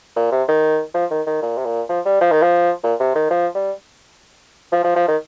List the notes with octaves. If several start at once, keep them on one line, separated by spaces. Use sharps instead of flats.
A#2
C3
D#3
F3
D#3
D#3
A#2
C3
A#2
F3
G3
F3
D#3
F3
A#2
C3
D#3
F3
G3
F3
F3
F3
D#3